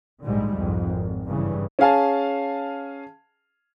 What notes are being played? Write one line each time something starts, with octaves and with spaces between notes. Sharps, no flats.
A#1 G#2 D3 G3 G#3
C2 F2 G#2
G#1
G2 C#3 E3
C#4 G#4 F5 G#5 A5